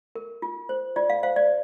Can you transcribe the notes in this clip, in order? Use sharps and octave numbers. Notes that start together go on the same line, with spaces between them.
A#4
F4
C5
F4 D5
F5
C5 F5
D5